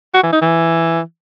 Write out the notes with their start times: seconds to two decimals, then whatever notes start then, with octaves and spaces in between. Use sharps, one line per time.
0.14 F#4
0.24 E3
0.33 D#4
0.42 E3